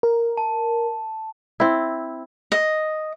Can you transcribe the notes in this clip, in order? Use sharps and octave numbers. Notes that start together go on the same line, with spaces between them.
A#4
A5
C4 E4
D#5